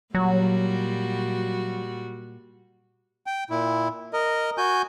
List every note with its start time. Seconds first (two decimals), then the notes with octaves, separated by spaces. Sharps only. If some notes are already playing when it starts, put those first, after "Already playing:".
0.15 A#2 F#3 G3 F#4
3.26 G5
3.50 A#2 E4
4.13 A#4 D#5
4.58 F#4 G#5 G6